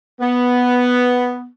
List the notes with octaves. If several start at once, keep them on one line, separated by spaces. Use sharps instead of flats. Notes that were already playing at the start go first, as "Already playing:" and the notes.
B3